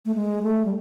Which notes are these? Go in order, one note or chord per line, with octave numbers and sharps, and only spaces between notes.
A3
G#3
A3
G3